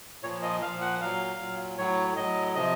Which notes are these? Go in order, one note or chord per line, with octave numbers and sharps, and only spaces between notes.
A#2 F3 C#5
D#5
A#2 F3 F5
F#5
A#2 F#3 F5
A#2 F#3
A2 F#3 C#5
A2 F#3 D#5
C3 F3 D#5